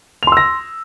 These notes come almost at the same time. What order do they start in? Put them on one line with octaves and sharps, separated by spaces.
F7 C6 E6 A#6